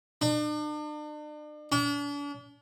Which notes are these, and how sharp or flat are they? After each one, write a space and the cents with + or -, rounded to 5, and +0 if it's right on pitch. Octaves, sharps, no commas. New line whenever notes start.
D4 +40
D4 -40